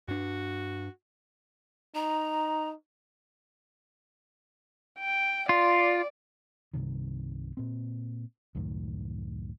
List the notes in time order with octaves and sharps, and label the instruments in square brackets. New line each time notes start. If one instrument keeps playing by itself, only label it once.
[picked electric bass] G2 D4 [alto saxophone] F#4
[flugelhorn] D#4 [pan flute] A#5
[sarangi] G5
[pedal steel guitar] F4 [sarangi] D5
[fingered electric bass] C2 G2 C3 D#3
A#2 C4
C#2 F#2 A2 D#3